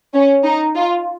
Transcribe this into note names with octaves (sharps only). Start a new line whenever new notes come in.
C#4
D#4
F4